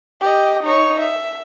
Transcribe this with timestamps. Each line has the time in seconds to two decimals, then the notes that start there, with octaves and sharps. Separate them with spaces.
0.21 G4 D#5
0.63 D#4 C#5
1.00 E5